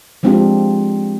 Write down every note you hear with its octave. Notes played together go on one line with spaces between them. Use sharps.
F3 G#3 C4 D4 F4 G4